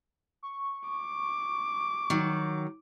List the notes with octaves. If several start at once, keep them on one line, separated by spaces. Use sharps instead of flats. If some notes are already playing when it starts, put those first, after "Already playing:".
C#6
D6
D#3 F#3